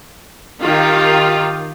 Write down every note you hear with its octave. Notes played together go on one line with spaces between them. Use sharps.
D#3 F4 G4